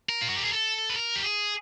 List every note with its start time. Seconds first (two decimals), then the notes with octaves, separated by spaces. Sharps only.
0.09 A#4
0.22 F4
0.29 F#4
0.37 G4
0.44 G#4
0.52 A4
0.90 B4
0.96 A#4
1.16 G4
1.24 G#4